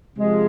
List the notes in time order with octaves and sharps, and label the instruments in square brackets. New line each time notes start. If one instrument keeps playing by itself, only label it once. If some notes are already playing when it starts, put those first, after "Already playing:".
[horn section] C3 F3 G#3